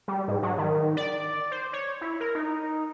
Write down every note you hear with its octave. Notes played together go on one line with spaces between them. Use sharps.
G3
G#2
F#3
D#3
D5
C5
C#5
E4
A#4
D#4